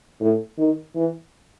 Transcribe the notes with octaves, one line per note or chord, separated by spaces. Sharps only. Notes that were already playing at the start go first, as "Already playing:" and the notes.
A2
D#3
E3